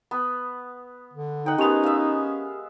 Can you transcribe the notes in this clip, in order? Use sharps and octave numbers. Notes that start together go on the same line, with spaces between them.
B3
D3
D#4 F#5 G5
G#3 B3 C#4 G4 A#4 F7
E5 F5